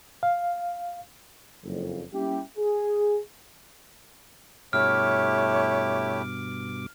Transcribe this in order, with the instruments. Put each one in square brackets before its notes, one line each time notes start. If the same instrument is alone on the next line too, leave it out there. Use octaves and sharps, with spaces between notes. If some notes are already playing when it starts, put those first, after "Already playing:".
[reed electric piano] F5
[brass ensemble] F#1 F2
G3 A#3 C#4 E4 G4
G#4
[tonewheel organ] G2 B2 D6 [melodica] A3 E4 G4 [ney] C#5 [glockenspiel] F6